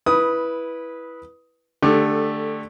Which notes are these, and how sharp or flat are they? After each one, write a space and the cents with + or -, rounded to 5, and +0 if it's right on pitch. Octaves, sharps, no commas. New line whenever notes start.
E4 +0 B4 -10 D#6 +10
D3 +15 A3 +0 G4 +15